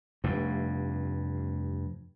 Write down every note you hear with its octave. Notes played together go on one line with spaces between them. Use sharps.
F1 G2